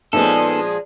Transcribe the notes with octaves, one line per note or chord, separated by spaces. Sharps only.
A#2 F3 G#3 B3 C#4 D#4 A4